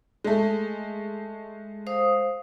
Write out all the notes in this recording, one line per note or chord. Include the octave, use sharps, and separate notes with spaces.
G#3 A3
C5 F5 D#6